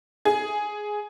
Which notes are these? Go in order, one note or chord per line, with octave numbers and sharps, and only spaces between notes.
G#4